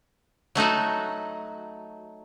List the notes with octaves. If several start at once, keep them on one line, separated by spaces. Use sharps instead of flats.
F#3 A3 D#4 F#4